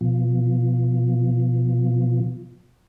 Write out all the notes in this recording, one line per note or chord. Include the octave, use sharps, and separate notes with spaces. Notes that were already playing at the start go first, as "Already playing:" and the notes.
B2 F3